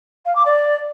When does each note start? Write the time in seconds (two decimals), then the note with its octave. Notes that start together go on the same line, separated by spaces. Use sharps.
0.25 F5
0.35 D6
0.45 D5